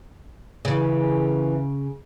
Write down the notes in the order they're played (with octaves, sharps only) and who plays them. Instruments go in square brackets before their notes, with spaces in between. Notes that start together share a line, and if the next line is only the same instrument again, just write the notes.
[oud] C#3 [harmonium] E3